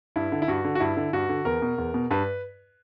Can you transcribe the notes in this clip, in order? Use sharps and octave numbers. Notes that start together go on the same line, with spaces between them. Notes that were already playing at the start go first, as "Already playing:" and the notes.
G2 E4
D3
E4
G2 F#4
D3
F#4
G2 E4
D3
G2 F#4
D3
E2 A#4
B2
E2
B2
G2 B4